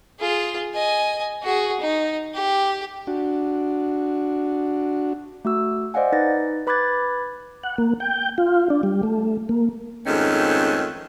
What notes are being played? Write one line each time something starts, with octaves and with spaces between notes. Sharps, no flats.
F4 G#4
D#5 G#5
F#4 G#4
D#4
G4
D4 F#4
A3 F#4 E6
C5 D5 D#5 F5 F#5 G#5
D#4 B4 A6 A#6
B4 B5 D6 F#6 G#6 A6
F#5
A#3
G5
F4
D4
G3
A3
A#3
F2 G#2 D#3 A3 C#4